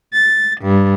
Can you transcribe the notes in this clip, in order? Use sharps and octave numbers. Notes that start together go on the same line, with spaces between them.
A6
G2